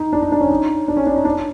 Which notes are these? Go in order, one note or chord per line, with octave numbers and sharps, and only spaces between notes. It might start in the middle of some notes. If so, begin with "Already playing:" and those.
Already playing: D#4
D4
D#4
D4
C#4
D#4
D4
C#4
D4
D#4
D4